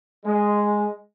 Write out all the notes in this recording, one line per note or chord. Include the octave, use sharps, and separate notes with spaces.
G#3